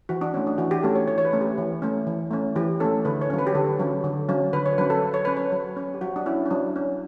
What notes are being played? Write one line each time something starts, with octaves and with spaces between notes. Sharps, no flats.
E3 F#4
D4
A3 C#4
D4
E3 F#4
G4
A3 C#4 A4
C#5
E3 C#5
C#5
B4
A3 C#4
G4
E3
A3 C#4
E3
A3 C#4
E3 G4
A3 C#4 A4
D3 B4
C#5
F#3 C#4
B4
G4
D3 A4
F#3 C#4
D3
F#3 C#4
D3 B4
C#5
F#3 C#4 B4
A4
F#3
C#5
C#4 B4
C#5
F#3
C#4
G4
F#3 F#4
D4
C#4 E4
C#4
F#3 D4
C#4